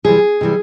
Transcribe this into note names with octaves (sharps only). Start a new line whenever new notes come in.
E2 C3 E3 G3 G#4
C3 E3 G3